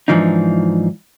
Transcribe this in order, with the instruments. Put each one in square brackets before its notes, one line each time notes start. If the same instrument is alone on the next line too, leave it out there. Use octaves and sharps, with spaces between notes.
[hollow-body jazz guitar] G#2 E3 F3 D4 D#4